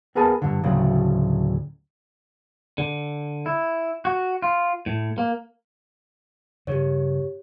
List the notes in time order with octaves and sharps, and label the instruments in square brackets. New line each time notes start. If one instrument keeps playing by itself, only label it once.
[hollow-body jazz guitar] B3 G#4 A#4 B4 G#5 A5
G2 D3
D2 A2 C#3 F#3
[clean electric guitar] D3
E4
F#4
F4
A2
A#3
[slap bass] G2 C#3 [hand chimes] G4 C#5